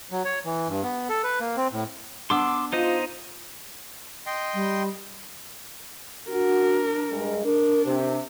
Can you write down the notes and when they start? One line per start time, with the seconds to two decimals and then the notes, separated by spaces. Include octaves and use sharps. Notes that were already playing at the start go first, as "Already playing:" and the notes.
0.11 F#3
0.25 C#5
0.45 E3
0.68 G2
0.84 B3
1.10 A4
1.24 B4
1.41 A#3
1.57 C4
1.72 A2
2.30 B3 D4 C6 D6 E6
2.73 D#4 F4 C5 D#5
4.26 D#5 G5 C6
4.54 G3
6.30 D4 F#4 A#4
7.11 G2 G#3
7.45 D4 A#4
7.85 C3